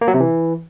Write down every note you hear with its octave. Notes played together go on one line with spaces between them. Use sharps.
A#3
F#3
C3
E3